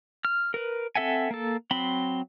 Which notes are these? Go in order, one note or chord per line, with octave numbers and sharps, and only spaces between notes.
F6
A#4 B4
C4 A4 E5 F#5 G#5
A#3 A4
F#3 C4 B5 C6